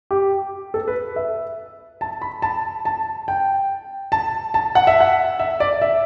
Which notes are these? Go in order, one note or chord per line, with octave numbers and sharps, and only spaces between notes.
G4
A4
B4
E5
A5
B5
A5
A5
G5
A5
A5
F#5
E5
F#5
E5
D5
E5